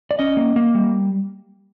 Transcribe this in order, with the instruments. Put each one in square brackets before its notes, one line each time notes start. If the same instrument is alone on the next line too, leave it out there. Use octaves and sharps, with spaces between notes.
[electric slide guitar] D5
C#4 D#5
A#3
A#3
G3